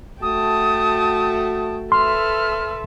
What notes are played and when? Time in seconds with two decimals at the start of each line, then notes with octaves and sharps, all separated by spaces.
0.22 A3 F#4 G5 A5 D#6
1.92 A4 B4 E5 C6 F6